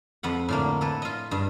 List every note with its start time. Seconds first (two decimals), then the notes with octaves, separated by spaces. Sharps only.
0.23 F2 B4 F#5
0.49 A2 D3 A#3
0.81 E4 A4 B4
1.02 F4 D#5
1.31 G2